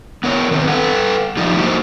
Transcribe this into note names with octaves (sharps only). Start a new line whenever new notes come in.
B3 A#4 C#5
D#3 C4 B4
A4 B4 F#5
F3 G3 D#4
A#3 D#4 F#4 C5